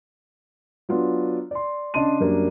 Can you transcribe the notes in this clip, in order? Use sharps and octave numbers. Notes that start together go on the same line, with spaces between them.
F#3 B3 D4 F4
D5 C6
C#3 D4 D#5 A5 C6 D#7
F#2 G3 A#3 D4